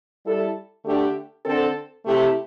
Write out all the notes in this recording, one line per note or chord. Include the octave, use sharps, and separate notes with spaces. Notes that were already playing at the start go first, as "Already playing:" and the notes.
G3 E4 A4
D3 A3 D4 G4
D3 C4 A4
C3 A3 E4 G4